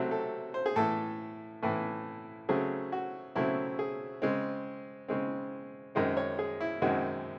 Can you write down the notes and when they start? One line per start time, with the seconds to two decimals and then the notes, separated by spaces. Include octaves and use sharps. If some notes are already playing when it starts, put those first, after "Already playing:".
Already playing: C3 F#3 A3 C4 F#4
0.11 A4
0.54 C5
0.66 G#4
0.76 A2 E3 A3 A4
1.62 A2 E3 A3
2.49 C#3 F#3 A3 C4 G#4
2.92 F#4
3.35 C#3 F#3 A3 C4 E4
3.79 G#4
4.22 C#3 G#3 C4
5.08 C#3 G#3 C4
5.95 F#2 D#3 G#3 C4 C5
6.17 C#5
6.39 G#4
6.61 E4
6.82 F#2 D#3 G#3 C4 F#4